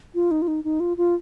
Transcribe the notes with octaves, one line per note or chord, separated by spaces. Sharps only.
F4
D#4
F4
D#4
D#4
F4
F4